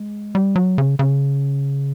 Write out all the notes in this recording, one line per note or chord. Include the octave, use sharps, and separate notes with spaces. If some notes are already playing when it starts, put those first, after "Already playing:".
Already playing: G#3
G3
F#3
C#3
C#3